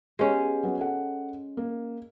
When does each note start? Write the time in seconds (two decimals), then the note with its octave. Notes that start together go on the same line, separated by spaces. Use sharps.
0.19 G#3 B3 C#4 G4
0.63 F#3 B3
0.79 A4 F#5
1.57 A#3